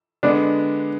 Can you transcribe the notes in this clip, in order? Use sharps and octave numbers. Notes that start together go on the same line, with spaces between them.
D3 G#3 B3 D4